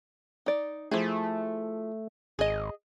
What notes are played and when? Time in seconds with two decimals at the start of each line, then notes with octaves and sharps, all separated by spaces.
0.46 D#4 D5
0.91 F3 A3 E4 G#4
2.39 G#1 G#4 D#5